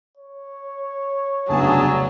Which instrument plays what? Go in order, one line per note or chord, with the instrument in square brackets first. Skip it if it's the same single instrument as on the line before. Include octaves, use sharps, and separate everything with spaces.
[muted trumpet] C#5
[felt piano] F1 B1 C#3 [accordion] G2 G#4 A5 [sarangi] F#3